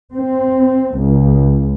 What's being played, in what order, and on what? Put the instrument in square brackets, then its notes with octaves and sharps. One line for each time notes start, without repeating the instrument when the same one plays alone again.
[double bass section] C4
C#2